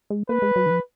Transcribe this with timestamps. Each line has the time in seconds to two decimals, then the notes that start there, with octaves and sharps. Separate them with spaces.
0.10 G#3
0.29 A#3 B4
0.42 G#3
0.56 F#3
0.66 D#3
0.70 F3